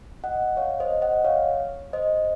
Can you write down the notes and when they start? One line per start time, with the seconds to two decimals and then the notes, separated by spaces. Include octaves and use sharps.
0.24 D#5 F#5
0.57 C#5 F5
0.80 C5 D#5
1.02 D#5 F#5
1.24 C#5 F5
1.93 C5 D#5